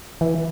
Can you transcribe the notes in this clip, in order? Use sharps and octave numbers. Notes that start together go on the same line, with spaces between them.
E3